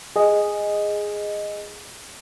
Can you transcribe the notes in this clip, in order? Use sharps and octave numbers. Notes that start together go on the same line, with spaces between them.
G#4 D#5